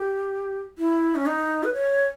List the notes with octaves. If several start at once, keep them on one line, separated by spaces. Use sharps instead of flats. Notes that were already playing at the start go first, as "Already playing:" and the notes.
Already playing: G4
E4
C#4
D#4
B4
C#5